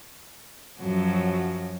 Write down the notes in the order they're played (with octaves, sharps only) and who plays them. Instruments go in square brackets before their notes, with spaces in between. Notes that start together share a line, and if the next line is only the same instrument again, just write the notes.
[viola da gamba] F#2 F3 F#3